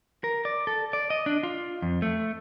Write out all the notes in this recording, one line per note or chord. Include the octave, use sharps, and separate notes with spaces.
A#4
D5
A4
D5
D#5
D4
F4
F2
A3